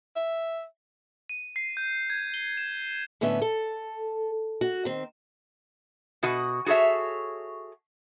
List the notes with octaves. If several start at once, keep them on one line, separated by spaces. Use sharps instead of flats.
E5
D#7
C7
G6
G#6
G7
E7
A2 D3 B3 C#4 E5
A4
F#4
D#3 C4
B2 F#4 D#5
F#4 G#4 A4 C#5 E5